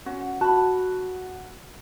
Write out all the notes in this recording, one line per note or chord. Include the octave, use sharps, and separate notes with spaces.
C#4 F#4 F#5
F#4 A5 B5 F#6